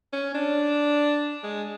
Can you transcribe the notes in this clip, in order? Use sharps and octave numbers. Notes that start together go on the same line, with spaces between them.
C#4
D4
G#3